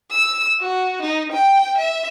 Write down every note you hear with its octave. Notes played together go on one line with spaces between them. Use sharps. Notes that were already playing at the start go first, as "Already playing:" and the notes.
E6
F#4
D#4
G5
E5